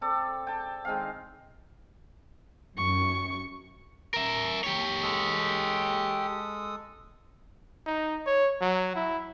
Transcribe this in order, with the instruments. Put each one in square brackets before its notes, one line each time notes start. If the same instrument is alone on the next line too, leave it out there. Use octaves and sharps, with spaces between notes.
[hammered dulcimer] C4 A4 D5
G5 A5
D#3 G#3 C4 F5
[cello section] F#2 [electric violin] C#6
[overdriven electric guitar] A#4 E5
G4 C#5
[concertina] G#3 A4 D#6
[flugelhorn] D#4
C#5
F#3
E4